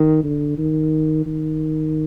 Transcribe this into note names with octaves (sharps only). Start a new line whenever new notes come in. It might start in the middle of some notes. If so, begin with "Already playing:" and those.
Already playing: D#3
D3
D#3
D#3